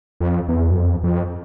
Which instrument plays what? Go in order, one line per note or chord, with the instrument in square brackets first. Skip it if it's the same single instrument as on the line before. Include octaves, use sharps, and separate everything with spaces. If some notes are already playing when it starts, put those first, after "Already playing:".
[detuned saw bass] F2
E2
F#2
F2
F2